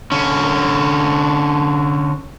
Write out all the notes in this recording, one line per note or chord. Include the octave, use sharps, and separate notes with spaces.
D3 C#4